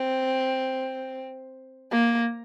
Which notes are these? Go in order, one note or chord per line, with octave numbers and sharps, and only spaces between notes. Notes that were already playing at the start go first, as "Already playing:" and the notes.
Already playing: C4
A#3